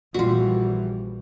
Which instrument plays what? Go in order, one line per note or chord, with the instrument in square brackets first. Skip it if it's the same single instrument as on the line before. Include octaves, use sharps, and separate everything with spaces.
[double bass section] A#1 E3 G3 [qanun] F4 F#4